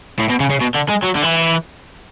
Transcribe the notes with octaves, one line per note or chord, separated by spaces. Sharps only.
A2
B2
C#3
C#3
B2
D3
G#3
F#3
D3
E3